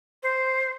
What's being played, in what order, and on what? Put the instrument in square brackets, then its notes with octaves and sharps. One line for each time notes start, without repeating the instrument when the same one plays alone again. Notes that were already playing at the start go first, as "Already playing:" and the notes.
[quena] C5